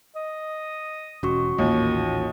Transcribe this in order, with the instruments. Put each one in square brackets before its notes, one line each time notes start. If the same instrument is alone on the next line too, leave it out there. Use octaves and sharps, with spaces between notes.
[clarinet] D#5
[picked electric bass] E1 [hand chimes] C#4 F#4 C#6
[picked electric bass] A1 A#2 [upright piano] D#2 [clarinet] D#5